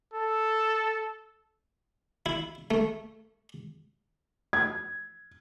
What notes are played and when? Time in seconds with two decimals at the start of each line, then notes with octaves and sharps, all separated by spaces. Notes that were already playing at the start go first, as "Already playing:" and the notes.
0.14 A4
2.26 E4
2.71 A3
4.53 G#6